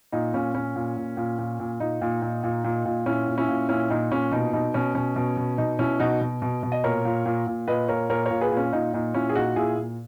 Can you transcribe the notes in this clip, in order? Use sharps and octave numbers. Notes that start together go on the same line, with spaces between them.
A#2 D#4
A#2 C#4
A#2 C#4
A#2
A#2
A#2
A#2
A#2
A#2 D#4
A#2
A#2
A#2
A#2
A#2
A#2 C#4 E4
A#2
C#4 E4
A#2
A#2 C#4 E4
A#2 D#4
A#2 C#4
B2 D#4
B2 D#4
B2 C#4
B2 C#4
B2
B2
B2 D#4
B2 C#4 E4
B2 D#4 F#4
B2
B2
B2
D#5
A#2 A#4 C#5
A#2
A#2
A#2
A#2 B4 D#5
A#2 A#4 C#5
A#2 A#4 C#5
A#2 A#4 C#5
G#4 B4
A#2
C#4
A#2 D#4
A#2 D#4
A#2 C#4 E4
G#4
A#2 D#4 F#4
A#2 E4 G#4
A#2